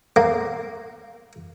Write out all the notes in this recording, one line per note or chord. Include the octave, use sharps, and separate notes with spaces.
A#3